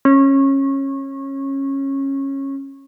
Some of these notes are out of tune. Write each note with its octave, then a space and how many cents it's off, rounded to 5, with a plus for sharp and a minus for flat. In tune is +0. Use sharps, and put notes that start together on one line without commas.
C#4 -20